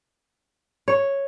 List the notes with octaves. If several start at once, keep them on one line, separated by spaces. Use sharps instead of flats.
C#5